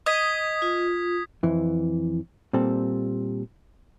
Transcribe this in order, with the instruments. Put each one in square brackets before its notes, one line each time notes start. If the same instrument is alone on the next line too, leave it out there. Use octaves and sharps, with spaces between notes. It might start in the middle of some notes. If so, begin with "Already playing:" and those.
[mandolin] D#5 [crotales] D#6 G#6 B6
[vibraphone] F4
[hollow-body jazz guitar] F2 E3
A#2 G3 C4 A4